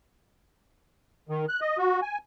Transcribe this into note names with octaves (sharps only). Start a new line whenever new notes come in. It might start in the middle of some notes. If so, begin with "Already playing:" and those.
D#3
F#6
D#5
F#4
G#5